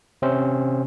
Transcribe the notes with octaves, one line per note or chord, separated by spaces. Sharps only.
C3 C4 C#4 C5